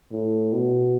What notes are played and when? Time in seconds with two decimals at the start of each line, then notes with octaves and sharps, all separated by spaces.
0.12 A2
0.53 B2